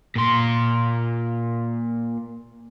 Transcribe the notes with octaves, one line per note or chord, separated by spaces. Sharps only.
A#2 C6